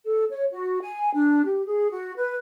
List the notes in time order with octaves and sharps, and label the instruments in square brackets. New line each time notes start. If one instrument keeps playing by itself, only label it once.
[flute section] A4
C#5
F#4
G#5
D4
G4
G#4
F#4
B4